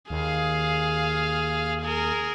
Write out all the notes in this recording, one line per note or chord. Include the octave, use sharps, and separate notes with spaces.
D#2 G#4 F5
G#4 A#4